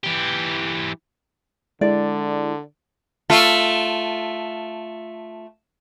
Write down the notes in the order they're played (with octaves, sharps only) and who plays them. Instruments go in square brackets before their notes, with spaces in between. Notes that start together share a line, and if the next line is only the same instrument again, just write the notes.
[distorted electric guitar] E3 G4
[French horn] D3 [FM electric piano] G#3 E4 [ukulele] D5
[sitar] A3 F4